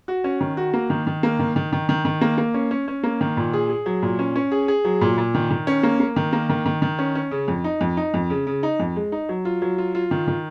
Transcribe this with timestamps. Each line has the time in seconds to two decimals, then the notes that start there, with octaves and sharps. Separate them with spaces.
0.08 F#4
0.24 C#4
0.41 D#3
0.57 F#4
0.74 A#3
0.90 D#3
1.07 D#3
1.23 A#3
1.39 D#3
1.56 D#3
1.72 D#3
1.89 D#3
2.05 D#3
2.21 A#3
2.38 A#3
2.54 C#4
2.71 C#4
2.88 C#4
3.03 A#3
3.21 D#3
3.37 A#2
3.54 G#4
3.70 G#4
3.86 F#3
4.02 A#2
4.19 C#4
4.36 C#4
4.52 G#4
4.68 G#4
4.85 F#3
5.01 A#2
5.18 A#2
5.35 D#3
5.50 D#3
5.67 C#4
5.83 A#3
6.00 A#3
6.16 D#3
6.33 A#3
6.50 D#3
6.66 D#3
6.82 D#3
6.99 C#4
7.15 C#4
7.31 C#3
7.48 F2
7.64 D#4
7.81 F2
7.97 D#4
8.14 F2
8.30 C#3
8.47 C#3
8.63 D#4
8.80 F2
8.96 G#3
9.12 D#4
9.29 F#3
9.45 F4
9.62 F#3
9.78 F4
9.95 F4
10.11 D#3
10.28 D#3